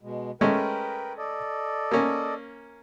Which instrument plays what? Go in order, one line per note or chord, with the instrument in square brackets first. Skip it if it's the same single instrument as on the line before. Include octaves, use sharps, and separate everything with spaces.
[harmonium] B2 G#3
[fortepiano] G#3 A3 C#4 [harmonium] A#4 B4 G5
[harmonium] A4 D5 D#5
[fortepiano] A#3 C#4